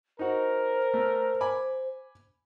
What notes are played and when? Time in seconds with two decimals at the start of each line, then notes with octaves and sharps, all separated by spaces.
0.19 D#4 F#4 A#4 C5
0.94 A3
1.41 G#5 B5 D6